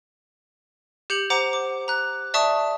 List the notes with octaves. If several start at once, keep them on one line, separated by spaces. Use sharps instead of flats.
G4 G6 C#7 F7 F#7
C5 F#5 A#5 D6
D6
A#5 F#6
D5 E5 A5 C#6 D#6